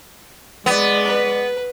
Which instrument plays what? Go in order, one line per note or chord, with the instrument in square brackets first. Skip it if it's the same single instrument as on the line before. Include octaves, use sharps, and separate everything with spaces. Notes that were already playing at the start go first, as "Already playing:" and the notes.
[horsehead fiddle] G#3 D5 [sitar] B3
[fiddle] B4